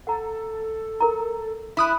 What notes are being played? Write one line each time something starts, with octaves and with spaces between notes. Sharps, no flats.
A4 F#5 A#5
A#4 A#5
E4 B5 D#6 F#6